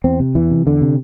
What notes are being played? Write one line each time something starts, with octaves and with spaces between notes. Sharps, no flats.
E2 C4
C3
E2 E3
C3
E2 D3
C3